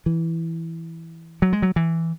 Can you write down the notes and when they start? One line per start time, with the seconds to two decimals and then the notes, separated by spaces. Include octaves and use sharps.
0.06 E3
1.42 F#3
1.53 G#3
1.62 F#3
1.76 E3